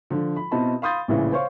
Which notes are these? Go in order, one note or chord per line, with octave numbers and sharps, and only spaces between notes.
D3 F3
B5
B2 C4 E4 D#5 A5 B5
F5 B5 C6 D#6 G6 A6
A#1 A2 C#3 E3
C5 C#5 F5 C#6